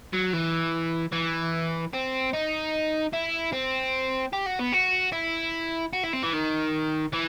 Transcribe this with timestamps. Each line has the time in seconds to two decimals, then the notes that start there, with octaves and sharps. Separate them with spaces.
0.13 F#3
0.33 E3
1.13 E3
1.93 C4
2.33 D#4
3.13 E4
3.53 C4
4.33 G4
4.46 F#4
4.60 B3
4.73 F#4
5.13 E4
5.93 F#4
6.04 E4
6.13 C4
6.23 E3
6.33 D#3
7.13 E3